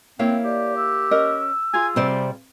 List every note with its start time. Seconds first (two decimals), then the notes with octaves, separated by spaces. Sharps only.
0.19 A#3 C4 E4 C#5 F5
0.45 G4 D5
0.76 E6
1.11 C#4 A#4 D#5
1.73 F4 G#4 G#5
1.96 C3 G3 C5 D5